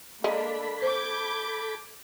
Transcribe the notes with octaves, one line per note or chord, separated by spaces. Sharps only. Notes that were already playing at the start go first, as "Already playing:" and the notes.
G#3 A#3 D4 A4 B5
C5 D6 G6 G#6